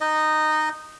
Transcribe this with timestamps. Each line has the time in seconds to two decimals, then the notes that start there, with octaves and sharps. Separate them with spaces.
0.01 D#4 D#5